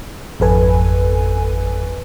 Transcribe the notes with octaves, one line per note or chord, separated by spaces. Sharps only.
G#1 F2 A4 B4 G#5